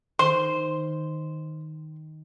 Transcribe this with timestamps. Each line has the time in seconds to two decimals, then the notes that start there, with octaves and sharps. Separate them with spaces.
0.19 D#3 C5 C6